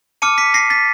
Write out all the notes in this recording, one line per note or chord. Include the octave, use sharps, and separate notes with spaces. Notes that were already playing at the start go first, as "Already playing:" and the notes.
A5 D6 F6 C#7 D#7
B6 C#7
A#6 C7
A6 B6